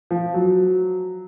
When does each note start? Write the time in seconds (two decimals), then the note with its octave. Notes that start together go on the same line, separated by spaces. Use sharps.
0.11 F3
0.34 F#3